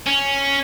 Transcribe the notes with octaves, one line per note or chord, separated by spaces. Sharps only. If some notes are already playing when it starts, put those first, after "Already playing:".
C#4